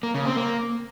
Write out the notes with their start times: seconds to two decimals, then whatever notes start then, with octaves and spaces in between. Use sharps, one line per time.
0.03 A#3
0.14 C#3
0.26 C4
0.37 A#3